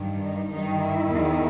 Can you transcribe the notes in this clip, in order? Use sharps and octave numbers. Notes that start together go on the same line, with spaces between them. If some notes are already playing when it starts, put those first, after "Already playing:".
Already playing: G2 D#3
D#4
G2 D#3 D#4
E4
E2 D#3